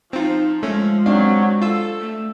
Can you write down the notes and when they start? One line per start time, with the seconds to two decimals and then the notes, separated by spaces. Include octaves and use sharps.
0.13 F3 C4 D#4 F4
0.63 G#3 A3 C#4
1.06 F#3 C4 D4 F5
1.62 F4 A4 E6
2.01 A3